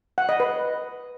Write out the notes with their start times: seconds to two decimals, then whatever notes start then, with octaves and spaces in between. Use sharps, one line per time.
0.18 F#5
0.29 D#5
0.40 B4